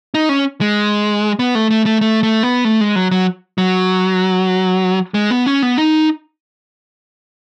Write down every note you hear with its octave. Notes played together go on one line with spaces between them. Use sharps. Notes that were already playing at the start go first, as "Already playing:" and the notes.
D#4
C#4
G#3
B3
A3
A3
A3
A3
A3
B3
A3
G#3
F#3
F#3
F#3
G#3
B3
C#4
B3
D#4